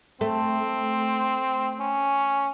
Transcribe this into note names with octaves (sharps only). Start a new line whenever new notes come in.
A3 C4
C#4